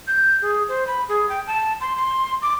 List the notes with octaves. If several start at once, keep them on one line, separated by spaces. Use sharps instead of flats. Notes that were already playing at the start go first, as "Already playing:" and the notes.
G6
G#4
C5
B5
G#4
G5
A5
C6
C6
D6